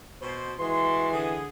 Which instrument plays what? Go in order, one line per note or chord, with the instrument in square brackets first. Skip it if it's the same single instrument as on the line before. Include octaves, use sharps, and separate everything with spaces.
[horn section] B2 C5
[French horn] E3 [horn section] G#3 F#4 C6
[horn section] D3 G#4